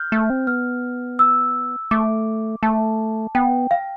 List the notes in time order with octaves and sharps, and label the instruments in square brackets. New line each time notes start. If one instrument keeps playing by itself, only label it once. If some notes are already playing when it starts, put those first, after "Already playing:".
Already playing: [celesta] F6 G6
[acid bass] A3
C4
[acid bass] B3 [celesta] F6
[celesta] E6
[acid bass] A3 [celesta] D6
[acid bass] A3 [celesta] A5
[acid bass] B3 [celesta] G5
[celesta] F5